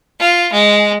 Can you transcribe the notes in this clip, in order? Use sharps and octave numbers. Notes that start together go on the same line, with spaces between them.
F4
G#3